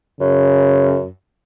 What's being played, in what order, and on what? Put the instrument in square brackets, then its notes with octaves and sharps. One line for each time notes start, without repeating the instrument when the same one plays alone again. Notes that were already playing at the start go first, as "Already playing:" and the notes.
[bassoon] F#2 [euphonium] C#3